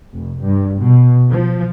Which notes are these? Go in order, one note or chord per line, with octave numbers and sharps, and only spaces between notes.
F1
G2
B2
F3